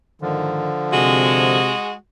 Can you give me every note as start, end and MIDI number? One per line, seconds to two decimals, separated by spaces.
0.21 0.68 44
0.21 1.60 50
0.21 0.68 51
0.21 1.60 53
0.93 1.72 48
0.93 1.93 56
0.93 1.93 66